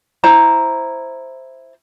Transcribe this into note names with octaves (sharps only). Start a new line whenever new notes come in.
E4 C5 A#5